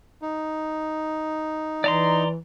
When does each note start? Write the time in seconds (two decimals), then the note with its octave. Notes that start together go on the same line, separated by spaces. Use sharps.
0.22 D#4
1.84 E3 D5 A#5 C6